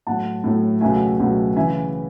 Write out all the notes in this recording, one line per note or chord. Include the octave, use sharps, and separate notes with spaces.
A2 F#3 A3 F#5 A5
A2 F#3 A3
C#2 B2 F#3 A3 E5 G#5
C#2 B2 F#3 A3
C#3 E3 E5 G#5